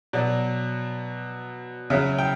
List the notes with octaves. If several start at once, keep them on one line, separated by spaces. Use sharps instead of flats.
B2 F#3 D5
C#3 F#3 E5
G5